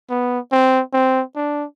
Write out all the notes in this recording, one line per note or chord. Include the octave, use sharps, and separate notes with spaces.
B3
C4
C4
D4